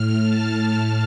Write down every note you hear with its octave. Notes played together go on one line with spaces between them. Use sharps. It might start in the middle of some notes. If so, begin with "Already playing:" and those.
Already playing: A2 F6
A5